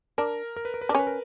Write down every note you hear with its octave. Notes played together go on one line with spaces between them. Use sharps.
D4 A#4
A#4
B4
A#4
B4
D4 A#4
C#4 B4
A#4